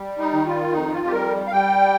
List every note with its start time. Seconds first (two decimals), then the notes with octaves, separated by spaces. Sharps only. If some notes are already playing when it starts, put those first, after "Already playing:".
Already playing: G3
0.19 D#4
0.33 D#3
0.46 F4
0.72 F2 D#4
0.93 F4
1.07 G4
1.12 G3 A#4
1.47 F5
1.51 G3 G5